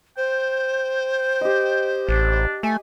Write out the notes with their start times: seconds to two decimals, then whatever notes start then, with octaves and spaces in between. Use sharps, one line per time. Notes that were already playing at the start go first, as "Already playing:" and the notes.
0.17 C5 G5
1.41 G4 D#5
2.09 A1 D4
2.63 A3 G#5